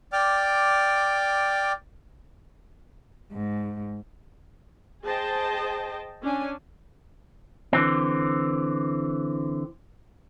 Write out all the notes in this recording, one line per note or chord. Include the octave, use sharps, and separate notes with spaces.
D5 G5 D6 F6
G#2
G#4 C5 D#5 G5 A5
C#4 D4 G#5
D3 E3 C4